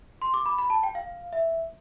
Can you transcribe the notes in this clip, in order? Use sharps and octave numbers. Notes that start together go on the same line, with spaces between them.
C6
D6
B5
B5
A5
G5
F5
E5